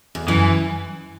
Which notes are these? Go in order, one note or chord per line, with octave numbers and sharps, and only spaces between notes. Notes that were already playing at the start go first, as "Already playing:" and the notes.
E2
F#2 E3